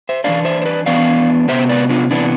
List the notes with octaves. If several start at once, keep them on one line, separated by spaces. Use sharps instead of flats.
C5 E5
E3 B3 D4 D5 F5
C5 E5
C5
B4 D5
E3 B3 D4 D5 F5
C3 E3 B3 C5 E5
B4 D5
D4 F4
C3 E3 B3 D4